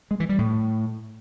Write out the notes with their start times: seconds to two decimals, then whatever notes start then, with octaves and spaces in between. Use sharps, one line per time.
0.11 G#3
0.20 E3
0.29 G3
0.39 A2